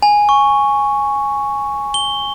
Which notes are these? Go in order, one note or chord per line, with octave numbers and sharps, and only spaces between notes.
G#5
C#6
G7